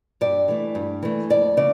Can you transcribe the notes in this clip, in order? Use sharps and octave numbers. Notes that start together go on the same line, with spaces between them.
G2 D5
E3 A3
G2
E3 A3
F2 D5
C#3 D5